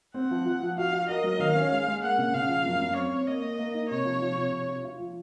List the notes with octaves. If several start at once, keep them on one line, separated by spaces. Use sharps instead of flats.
C4 F#5
F3
F3
F3
F#4 F5
F#4
A#4 D#5
F#3
D#3 F5
C#4
G#3
G#3
A#3 F#5
C#3
C#3 F5
F3
F#2
F#2
C4 C#5
C4
A#3 D#5
A#3
A#3
D#4
C3 C#5
F3
F3
C3
C3
F4
F4
F3